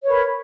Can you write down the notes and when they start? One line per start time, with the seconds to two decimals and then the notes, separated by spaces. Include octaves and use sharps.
0.02 C#5
0.05 B4
0.07 A#4
0.10 B5